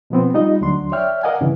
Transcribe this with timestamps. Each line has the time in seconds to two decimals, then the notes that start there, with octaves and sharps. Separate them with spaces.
0.10 B2 F3 B3 C4
0.34 G3 D#4 F4 D#5
0.61 D2 F#3 D4 C6
0.92 C#5 D5 E5 G5 F6
1.23 A#4 D5 D#5 F5 F#5 G#5
1.41 G2 C#3 E3